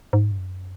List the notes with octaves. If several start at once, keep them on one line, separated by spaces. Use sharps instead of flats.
G#2
G2
F#2